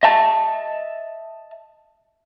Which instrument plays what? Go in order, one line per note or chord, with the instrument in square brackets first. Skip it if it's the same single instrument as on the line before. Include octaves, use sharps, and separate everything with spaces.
[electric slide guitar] D#5 E5 A5